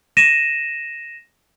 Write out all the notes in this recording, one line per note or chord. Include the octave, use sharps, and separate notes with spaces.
A#6 D#7 E7